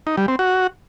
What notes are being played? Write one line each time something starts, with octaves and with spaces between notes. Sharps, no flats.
D#4
G3
C4
F#4